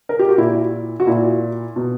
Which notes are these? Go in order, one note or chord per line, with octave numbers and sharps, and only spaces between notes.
A#4
G4
F#4
A#2 E4
F#4
A#2 E4
B2